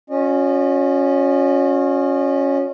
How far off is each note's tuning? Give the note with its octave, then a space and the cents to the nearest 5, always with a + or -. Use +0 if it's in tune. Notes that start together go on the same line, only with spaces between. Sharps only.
C#4 +0 F#4 -40 D#5 -40